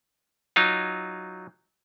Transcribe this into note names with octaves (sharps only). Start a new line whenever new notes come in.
F#3 D#4 F4